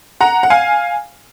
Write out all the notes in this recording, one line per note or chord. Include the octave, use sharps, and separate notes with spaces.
F#5 A#5
F#5
F5 G#5